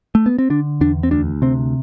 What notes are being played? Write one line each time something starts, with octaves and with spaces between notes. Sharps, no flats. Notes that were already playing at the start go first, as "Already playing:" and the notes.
A3
B3
C4
D3 D4
E2 D4
C4
D2 D4
C3 C4